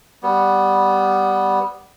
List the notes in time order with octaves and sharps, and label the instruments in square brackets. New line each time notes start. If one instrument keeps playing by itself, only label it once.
[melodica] G3 B3